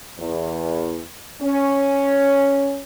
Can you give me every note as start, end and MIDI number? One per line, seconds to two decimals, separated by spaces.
0.19 1.00 40
1.42 2.83 61